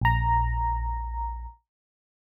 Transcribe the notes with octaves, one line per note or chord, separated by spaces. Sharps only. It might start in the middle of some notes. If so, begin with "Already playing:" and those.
A#1 A#5